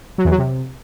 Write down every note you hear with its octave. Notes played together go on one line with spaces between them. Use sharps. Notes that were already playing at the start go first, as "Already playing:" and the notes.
F#3
E2
F#3
C3